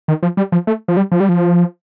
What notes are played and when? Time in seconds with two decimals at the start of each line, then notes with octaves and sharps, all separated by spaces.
0.08 D#3
0.23 F3
0.37 G3
0.52 F3
0.67 A3
0.88 F3
0.97 G3
1.12 F3
1.20 G3
1.29 F3